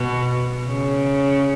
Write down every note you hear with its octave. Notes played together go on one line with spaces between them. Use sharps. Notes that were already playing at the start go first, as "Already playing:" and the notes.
Already playing: B2
C#3